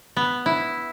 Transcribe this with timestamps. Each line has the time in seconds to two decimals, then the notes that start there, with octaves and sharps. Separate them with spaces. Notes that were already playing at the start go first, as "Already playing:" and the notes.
0.16 B3
0.46 E4